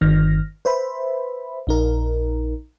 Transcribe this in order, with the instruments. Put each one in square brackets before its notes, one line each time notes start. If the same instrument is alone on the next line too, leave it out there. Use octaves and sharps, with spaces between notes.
[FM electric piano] G1 D#3 F6 A#6
B4 C5 E5 B5
A#1 D#4 A#4